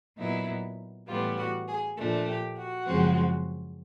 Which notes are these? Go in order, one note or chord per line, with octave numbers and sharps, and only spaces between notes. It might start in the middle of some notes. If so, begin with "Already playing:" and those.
A#2 F#3 B3 D#4 E4
A2 E3 G3 B3 F4
F#4
G#4
A#2 F3 A3 D4 A4
G4
F#4
F#2 C#3 F3 G#3 C4